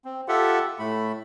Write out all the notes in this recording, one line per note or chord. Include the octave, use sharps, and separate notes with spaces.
C4
F4 G4 A4 E5 F#5
A2 A3 B5